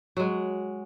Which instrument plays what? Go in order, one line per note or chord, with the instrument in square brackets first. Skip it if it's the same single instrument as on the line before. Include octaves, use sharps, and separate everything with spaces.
[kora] F#3 G#3